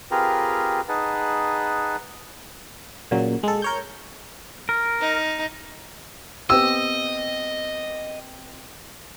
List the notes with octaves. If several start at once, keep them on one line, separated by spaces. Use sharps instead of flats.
C4 F4 G4 G#4 A#4 B4
D#4 G#4 B4 F#5 A5
A#2 C#3 F#3
G#3 A4
A#4 C#5 G6
A#4
D#4
B3 C4 G4 D#5 E6